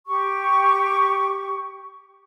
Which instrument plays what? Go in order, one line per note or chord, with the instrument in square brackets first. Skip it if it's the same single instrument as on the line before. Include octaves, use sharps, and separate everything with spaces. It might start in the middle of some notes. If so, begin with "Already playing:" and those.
[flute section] G4 C#6